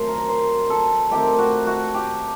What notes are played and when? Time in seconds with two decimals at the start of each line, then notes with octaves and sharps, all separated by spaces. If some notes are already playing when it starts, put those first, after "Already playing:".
Already playing: D#3 F#3 A3 C4 C5
0.08 A#4
0.29 C5
0.70 A4
1.11 D#3 A3 C4 G4
1.38 F#4
1.67 F#4
1.94 G4